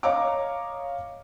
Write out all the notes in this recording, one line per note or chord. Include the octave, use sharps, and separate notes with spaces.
C#5 D#5 F5 A#5 D6